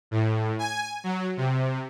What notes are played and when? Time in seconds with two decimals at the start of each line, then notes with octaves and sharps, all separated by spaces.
0.11 A2
0.59 G#5
1.04 F#3
1.37 C3